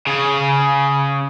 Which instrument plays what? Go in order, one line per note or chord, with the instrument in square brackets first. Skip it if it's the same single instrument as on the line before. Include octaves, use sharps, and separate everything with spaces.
[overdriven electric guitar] C#3 G#4